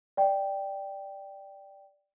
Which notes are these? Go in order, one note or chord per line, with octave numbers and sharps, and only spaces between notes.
D5 G5